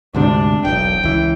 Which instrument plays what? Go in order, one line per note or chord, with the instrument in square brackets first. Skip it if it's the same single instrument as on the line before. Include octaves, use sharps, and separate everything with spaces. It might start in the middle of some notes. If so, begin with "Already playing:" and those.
[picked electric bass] D2 G#2 C3 [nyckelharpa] D4
[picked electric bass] E1 B1 [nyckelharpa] G5
[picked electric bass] C#2 E3